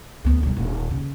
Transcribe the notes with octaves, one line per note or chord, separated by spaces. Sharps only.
D2 B3
B1 G3
D#1
C#3